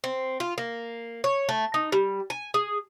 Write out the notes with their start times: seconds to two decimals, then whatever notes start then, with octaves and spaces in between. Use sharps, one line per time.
0.04 C4
0.40 F4
0.58 A#3
1.24 C#5
1.49 A3
1.74 D#4
1.92 G3
2.30 G#5
2.54 G#4